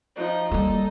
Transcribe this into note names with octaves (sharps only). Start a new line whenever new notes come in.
F3 D#4
G3 A#3 D#4 A4